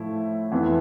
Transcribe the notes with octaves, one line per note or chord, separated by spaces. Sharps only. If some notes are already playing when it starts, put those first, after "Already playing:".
Already playing: A2 F3 A3 E4
F2 E3 B3